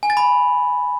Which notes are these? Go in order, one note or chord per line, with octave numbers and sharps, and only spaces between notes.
G#5
A6
B5